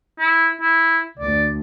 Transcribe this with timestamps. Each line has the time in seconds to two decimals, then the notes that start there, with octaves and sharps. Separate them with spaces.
0.19 E4
0.61 E4
1.20 D2 D5